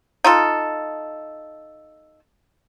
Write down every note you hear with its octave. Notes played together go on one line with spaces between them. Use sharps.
D#4 F4 A4